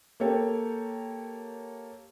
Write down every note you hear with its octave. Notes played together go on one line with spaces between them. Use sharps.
A#3 G4 A4 C#5 G5